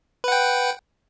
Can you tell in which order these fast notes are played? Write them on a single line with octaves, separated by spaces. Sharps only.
B4 F#5 G5